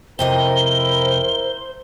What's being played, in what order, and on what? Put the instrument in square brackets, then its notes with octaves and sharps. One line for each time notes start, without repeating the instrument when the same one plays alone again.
[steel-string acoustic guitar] F2 C3 D#5 [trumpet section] E4 A#4 [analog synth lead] C5 [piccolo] G7